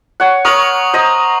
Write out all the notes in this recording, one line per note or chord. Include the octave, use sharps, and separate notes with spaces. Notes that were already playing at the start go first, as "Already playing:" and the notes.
C#5 F#5
A#4 C#5 C#6 D#6 F#7
C5 D#5 A#5